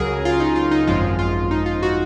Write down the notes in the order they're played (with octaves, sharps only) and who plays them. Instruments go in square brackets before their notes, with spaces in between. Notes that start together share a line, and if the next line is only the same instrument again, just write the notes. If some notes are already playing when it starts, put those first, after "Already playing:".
Already playing: [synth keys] C#2 C#3 F#3 G#4 A#4
F4
D#4
F4
D#4
G#1 F#2 F3 G#3 F4
F4
D#4
F4
F#4